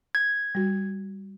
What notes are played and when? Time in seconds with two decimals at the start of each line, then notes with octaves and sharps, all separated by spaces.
0.15 G#6
0.55 G3 F#4